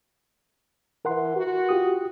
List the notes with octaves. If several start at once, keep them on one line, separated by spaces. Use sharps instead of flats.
E3 A#4 F#5 C6
F#4
F4 G4 D#6